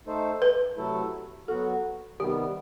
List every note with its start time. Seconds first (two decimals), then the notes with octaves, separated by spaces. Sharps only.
0.07 A3 D#4 A4 C5
0.42 B4
0.77 C3 F#3 A3 E4 A4
1.48 F#3 B3 F#4 A4
2.20 C3 D#3 G3 B3 G4